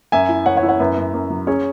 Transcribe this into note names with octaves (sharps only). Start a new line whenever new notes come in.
F#2 E5 G#5
E4
F#2 C#5 F#5
C#5 F#5
E4
C#5 F#5
F#2 B4 E5
F#2
F#2
F#3
C#4 G#4 C#5